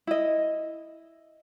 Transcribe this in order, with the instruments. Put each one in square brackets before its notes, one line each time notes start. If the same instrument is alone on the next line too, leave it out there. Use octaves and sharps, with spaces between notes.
[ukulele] E4 D#5